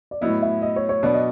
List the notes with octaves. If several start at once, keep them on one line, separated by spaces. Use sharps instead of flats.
D5
A2 F#3 B3 E4 D#5
E5
D#5
C#5
C#5
B2 F#3 B3 D4 D5
D#5